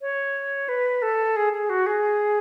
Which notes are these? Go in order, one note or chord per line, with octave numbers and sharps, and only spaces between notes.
C#5
B4
A4
G#4
G#4
F#4
G#4